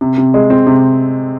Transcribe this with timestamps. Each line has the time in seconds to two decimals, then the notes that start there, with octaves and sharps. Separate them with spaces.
0.01 C3
0.18 C3
0.34 G#3
0.50 C4
0.67 C3